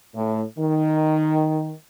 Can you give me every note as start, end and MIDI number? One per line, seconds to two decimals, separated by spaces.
0.15 0.42 45
0.59 1.73 51